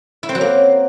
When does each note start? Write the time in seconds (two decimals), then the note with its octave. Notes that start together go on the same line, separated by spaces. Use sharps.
0.23 E4
0.29 C4
0.35 F#3
0.41 A#3